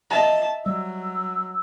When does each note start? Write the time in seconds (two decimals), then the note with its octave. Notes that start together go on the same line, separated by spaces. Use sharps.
0.11 D#5 E5 A5 A#5
0.66 F#3 G3 E6